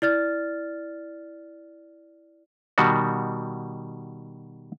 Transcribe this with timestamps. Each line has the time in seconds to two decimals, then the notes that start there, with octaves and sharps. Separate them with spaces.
0.02 E4 D5 F6 A6
2.78 B2 D#3 G3 F#4